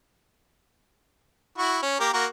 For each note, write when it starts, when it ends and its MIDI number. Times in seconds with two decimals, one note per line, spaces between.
1.58 1.78 64
1.58 1.78 66
1.58 1.78 85
1.82 1.98 61
2.00 2.09 58
2.00 2.09 67
2.00 2.09 70
2.13 2.26 58
2.13 2.26 66
2.13 2.26 70